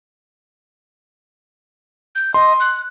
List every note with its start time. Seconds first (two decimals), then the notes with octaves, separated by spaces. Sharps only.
2.15 G6
2.34 D#5 C6
2.60 F#6